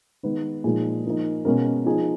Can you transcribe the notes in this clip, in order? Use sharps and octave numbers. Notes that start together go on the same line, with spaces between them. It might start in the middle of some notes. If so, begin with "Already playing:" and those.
D#3 G#3 B3 D#4 B4
A#2 F3 G#3 D#4 G#4
F3 A#3 D#4
B2 G#3 C#4 A#4
F3 B3 D#4 G#4